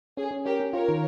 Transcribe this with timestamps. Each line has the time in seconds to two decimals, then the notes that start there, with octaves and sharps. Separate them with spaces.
0.17 C#4 G#4
0.31 C#4
0.45 C#4 G4 A#4
0.60 C#4
0.73 F4 A#4 C#5
0.89 D#3